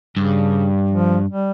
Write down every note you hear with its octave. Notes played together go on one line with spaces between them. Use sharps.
G2 C#3
F3
G3